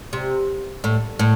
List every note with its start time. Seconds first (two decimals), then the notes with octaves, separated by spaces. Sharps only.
0.13 C3
0.84 A2
1.19 A2